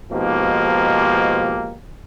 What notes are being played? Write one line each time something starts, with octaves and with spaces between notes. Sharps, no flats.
G#2 B2 F3 A#3 D#4 G4